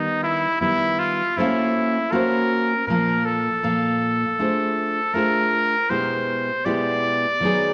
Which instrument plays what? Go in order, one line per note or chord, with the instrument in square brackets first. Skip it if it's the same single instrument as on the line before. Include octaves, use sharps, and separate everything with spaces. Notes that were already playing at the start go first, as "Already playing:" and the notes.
Already playing: [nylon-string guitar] D#3 G3 B3 [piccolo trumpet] D#4
[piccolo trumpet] E4
[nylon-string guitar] D#3 G3 B3 [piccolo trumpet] E4
[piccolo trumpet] F4
[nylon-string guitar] A#3 C#4 F#4 A4 C5 [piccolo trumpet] E4
[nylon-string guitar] A#3 C#4 F#4 A4 C5 [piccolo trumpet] A#4
[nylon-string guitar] A#2 F3 A#3 [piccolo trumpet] A#4
[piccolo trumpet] A4
[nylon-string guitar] A#2 F3 A#3
A3 D4 F4 G#4 C5
[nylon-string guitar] A3 D4 F4 G#4 C5 [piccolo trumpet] A#4
[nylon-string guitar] B2 G#3 B3 E4 G4 [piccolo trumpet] C5
[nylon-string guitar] B2 G#3 B3 E4 G4 [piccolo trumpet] D5
[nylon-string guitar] D#3 F#3 B3 D#4 G#4